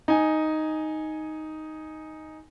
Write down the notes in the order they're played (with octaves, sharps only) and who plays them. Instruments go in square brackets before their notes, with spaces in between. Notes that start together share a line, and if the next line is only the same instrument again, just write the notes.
[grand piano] D#4 G#5